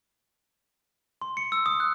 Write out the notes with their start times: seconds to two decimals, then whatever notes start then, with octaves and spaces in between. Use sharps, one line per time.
1.22 C6
1.37 C#7
1.52 E6
1.66 D#6
1.80 F#6